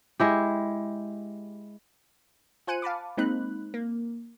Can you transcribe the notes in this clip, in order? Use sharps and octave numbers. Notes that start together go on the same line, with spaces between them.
G#3 E4 G4
F4 C5 G#5 F#6 C#7 D#7
F5 A5 B5 D6
G#3 A#3 C4 D#4 B5 F#6
A#3